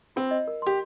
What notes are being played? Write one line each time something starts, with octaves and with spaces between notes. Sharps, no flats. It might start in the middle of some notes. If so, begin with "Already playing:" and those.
C4 F4
D#5
A#4
G4 C6